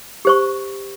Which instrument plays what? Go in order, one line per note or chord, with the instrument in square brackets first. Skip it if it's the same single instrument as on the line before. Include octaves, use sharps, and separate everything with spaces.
[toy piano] G4 C5 C#6